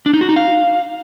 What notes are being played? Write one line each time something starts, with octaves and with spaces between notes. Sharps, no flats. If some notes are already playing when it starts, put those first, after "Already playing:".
D4
D#4
F#4
D#4
F5